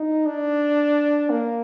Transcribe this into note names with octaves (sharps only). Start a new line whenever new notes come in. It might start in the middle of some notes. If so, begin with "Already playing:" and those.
Already playing: D#4
D4
A#3